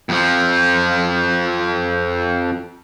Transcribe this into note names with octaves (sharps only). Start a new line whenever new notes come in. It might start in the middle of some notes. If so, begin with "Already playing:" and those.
F2 F3